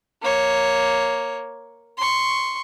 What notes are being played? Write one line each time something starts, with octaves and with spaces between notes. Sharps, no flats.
A#3 C#5
C6 C#6